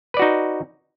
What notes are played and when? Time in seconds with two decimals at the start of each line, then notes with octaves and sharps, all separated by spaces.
0.14 B4
0.17 D5
0.19 F#4
0.22 D#4